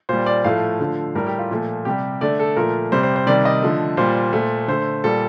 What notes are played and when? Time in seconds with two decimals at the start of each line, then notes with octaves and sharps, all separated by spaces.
0.09 A#2 G3 C5
0.26 D5
0.44 A2 F3 A3 F5
0.80 D3 F3 A3
1.15 A2 G3 A#4
1.27 G4
1.39 F4
1.51 A#2 F3 A3
1.85 C3 G3 G4
2.21 D3 A3 D5
2.39 A4
2.56 A#2 F3 A3 A#4
2.92 C3 G3 C5
3.03 C5
3.16 C5
3.27 C3 D#3 G3 D5
3.45 D#5
3.62 D3 F3 A3
3.97 A#2 G3 C5
4.33 A#2 A3
4.68 D3 A3 C5
5.04 A#2 G3 A4